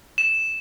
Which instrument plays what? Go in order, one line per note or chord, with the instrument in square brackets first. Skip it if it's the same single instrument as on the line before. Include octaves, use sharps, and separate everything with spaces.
[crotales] E7